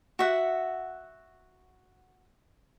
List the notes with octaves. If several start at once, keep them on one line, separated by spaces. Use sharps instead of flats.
F#4 E5 F#5